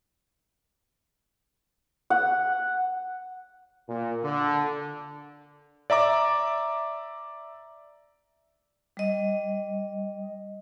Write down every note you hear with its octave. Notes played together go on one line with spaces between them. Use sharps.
F#5
A#2
D3
D5 E5 A#5 D6
G3 D#5